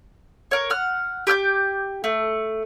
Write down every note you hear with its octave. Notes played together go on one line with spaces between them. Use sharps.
A#4 C#5
F#5 F6
G4 D6 F6 G6
A3